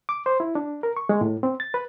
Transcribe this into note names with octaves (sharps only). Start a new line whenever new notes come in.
D6
C5
E4
D4
A#4
C#6
G#3
A2
C4
A6
B4